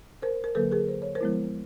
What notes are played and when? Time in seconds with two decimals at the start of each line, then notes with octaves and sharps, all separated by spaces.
0.22 A#4 C5
0.44 A#4
0.55 D3 F#3 A#3 A4 B4
0.72 G#4 A#4
0.88 C5
1.02 C#5
1.15 A#4 C5
1.21 F3 G#3 B3 E4